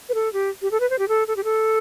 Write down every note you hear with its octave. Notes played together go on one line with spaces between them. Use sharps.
B4
A4
G4
G4
A4
B4
C5
G4
A4
A4
G4
A4